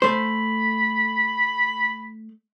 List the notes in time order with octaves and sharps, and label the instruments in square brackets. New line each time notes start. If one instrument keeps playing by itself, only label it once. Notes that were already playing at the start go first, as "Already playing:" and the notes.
[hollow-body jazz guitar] A3 C5 [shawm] B5